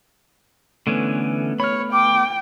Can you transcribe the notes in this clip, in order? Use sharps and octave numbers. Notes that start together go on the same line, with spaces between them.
D3 E3 A3 B3 C#4
C#5 B5 F6
G5 D6